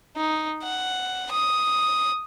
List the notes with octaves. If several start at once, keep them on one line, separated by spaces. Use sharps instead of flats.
D#4
F#5
D#6